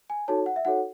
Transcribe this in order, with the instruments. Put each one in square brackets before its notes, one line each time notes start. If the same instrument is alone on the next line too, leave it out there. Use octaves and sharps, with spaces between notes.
[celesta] G#5
D#4 F#4 A4 C#5 A5
F#5
E5
D#4 F#4 A4 C#5 F#5